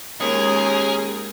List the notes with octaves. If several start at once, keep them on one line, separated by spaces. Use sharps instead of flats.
D#2 G#3 A#3 C#4 G#4 A#4